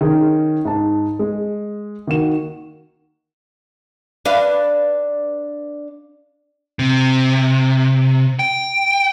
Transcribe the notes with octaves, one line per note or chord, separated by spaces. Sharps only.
D#3 C#4 G#4
G#2 A5
G#3
D#3 A#3 F#4 E7
D4 B4 F5
C3
G5